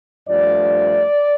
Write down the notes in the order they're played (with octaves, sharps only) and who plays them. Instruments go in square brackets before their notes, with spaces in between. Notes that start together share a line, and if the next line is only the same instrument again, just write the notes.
[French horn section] G2 F3 A3 D5